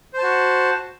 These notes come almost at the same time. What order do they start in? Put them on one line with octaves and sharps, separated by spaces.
C5 A5 F#4